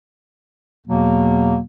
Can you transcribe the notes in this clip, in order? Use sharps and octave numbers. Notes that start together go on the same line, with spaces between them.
E2 B2 F#3 A#3